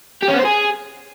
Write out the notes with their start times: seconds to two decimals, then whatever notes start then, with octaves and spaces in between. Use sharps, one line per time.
0.23 G4
0.29 C#4
0.34 B3
0.40 C5
0.46 G#4